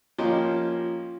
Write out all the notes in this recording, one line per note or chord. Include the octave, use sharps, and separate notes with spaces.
F3 A#3 C#4 G4 D#5 C6